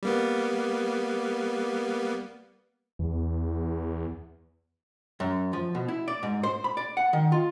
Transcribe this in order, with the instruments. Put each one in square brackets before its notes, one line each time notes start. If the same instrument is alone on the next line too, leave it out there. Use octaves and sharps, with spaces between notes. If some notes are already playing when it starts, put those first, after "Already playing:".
[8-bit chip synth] G3 A#3 B3
[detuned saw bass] E2
[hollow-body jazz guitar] F#2
F3
B2
E4
D5
G#2
C5
B5
D5
F#5
D#3
F4